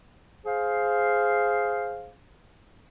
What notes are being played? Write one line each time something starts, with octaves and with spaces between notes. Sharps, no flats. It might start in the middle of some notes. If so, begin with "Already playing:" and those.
G#4 C5 F5